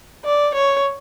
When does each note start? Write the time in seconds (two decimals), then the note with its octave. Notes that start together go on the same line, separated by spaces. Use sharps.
0.25 D5
0.54 C#5